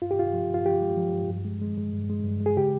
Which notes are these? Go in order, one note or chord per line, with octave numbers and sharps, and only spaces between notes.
G2 F4
G4
G2 F4
F3
G2 F4
F3 G4
G#3
F3
G2
G2
G#3
G#3
G#3
G2
G#3
G2
G#3
G#4
C#3 G4